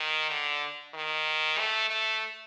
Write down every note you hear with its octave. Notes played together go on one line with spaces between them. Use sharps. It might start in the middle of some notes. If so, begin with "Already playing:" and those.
Already playing: D#3
D3
D#3
A3
A3